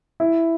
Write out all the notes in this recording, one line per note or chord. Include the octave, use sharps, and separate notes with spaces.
E4